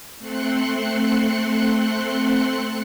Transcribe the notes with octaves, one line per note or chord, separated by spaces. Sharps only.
A3 C4 C6 F#6 C#7